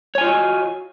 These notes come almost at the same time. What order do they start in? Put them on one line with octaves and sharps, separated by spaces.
C#5 G#5 F4 D#5 F#4